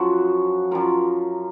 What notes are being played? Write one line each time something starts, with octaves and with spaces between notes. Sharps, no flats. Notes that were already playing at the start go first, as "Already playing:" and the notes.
Already playing: F#2 F3 F#4
F#2 F3 A#4